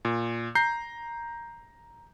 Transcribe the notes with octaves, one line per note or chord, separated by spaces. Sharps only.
A#2
A#5 G6 C7